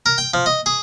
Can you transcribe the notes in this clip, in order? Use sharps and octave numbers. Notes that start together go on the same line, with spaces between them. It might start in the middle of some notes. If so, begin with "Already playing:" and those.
A#4
G5
F3
D#5
G#4